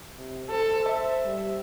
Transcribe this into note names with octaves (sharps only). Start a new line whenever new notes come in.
C3
A4 C5
E5
G3